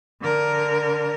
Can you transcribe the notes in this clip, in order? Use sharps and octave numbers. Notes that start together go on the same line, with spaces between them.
D3 A#4